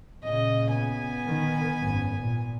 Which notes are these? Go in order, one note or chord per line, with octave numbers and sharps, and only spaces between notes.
A#2 C#3 D#5
B3 G#5
D#3
G#1 F#2
A#2